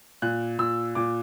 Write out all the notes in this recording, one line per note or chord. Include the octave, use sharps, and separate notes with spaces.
A#2 F#6
A#2 E6
A#2 D6